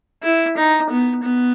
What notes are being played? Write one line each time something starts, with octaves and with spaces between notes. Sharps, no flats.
E4
D#4
B3
B3